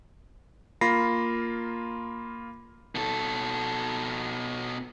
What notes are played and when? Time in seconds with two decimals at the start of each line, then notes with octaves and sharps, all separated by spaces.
0.81 A#3 F4 B5 A#6 C7
2.95 B2 A4